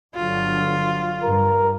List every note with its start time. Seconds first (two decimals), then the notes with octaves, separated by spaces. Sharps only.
0.15 G1 D3 F#3 F4
1.23 G2 A#4